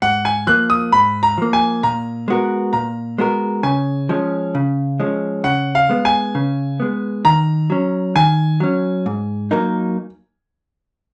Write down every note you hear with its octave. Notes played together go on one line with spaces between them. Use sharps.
G#2 F#5
G#5
F3 A#3 F#6
D#6
G#2 B5
A#5
F3 A#3
G#5
A#2 A#5
G#3 B3 F#4 A#4
A#2 A#5
G#3 B3 F#4 A#4
C#3 G#5
F3 G#3 C#4
C#3
F3 G#3 C#4
C#3 F#5
F5
G#3 B3
G#5
C#3
G#3 B3
D#3 A#5
F#3 C#4
D#3 G#5
F#3 C#4
G#2
F#3 A#3 D#4 A#4